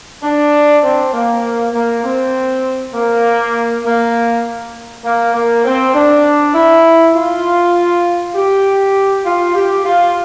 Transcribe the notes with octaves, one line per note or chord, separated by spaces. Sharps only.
D4
C4
A#3
A#3
C4
A#3
A#3
A#3
A#3
C4
D4
E4
F4
G4
F4
G4
F4